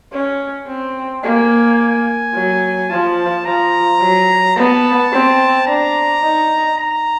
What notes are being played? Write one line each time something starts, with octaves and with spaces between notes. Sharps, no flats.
C#4
C4
A#3 G#5
F#3
F3 A5
F3 A#5
F#3
B3 A5
C4
D4 A#5
D#4
A#5